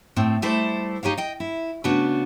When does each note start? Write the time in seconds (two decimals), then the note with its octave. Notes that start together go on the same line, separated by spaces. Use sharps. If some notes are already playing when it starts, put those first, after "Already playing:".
0.16 A2 C4
0.42 G3 A3 E4 A4 C5
1.03 D#4 G4 C#5 F5
1.17 D#5 G5
1.40 E4
1.84 C#3 A3 B3 D4 F#4